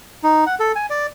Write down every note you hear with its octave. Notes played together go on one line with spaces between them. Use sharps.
D#4
F#5
A4
G#5
D5